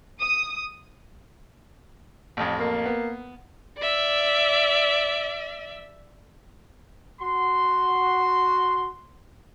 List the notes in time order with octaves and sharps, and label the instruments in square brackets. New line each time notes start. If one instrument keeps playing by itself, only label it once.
[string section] D#6
[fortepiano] A1 F2
[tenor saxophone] A#3
[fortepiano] B3
[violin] D5 E5
[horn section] F#4 C6